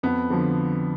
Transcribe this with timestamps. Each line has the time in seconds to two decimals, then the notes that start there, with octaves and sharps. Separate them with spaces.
0.03 F2 B3
0.30 D3 F3